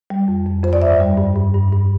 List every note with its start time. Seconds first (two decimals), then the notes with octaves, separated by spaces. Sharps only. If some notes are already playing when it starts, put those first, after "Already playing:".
0.10 G3
0.28 F2
0.46 F2
0.64 F2 C5
0.73 D5
0.82 G2 E5
1.00 G3
1.17 G2
1.36 G2
1.54 G2
1.72 G2